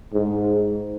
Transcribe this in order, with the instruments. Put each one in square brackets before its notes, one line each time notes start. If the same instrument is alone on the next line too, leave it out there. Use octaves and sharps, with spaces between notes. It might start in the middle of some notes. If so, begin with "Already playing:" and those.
[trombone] G#2